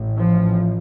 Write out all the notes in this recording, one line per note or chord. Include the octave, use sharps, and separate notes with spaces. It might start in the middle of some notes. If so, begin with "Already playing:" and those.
Already playing: A1 A2
F3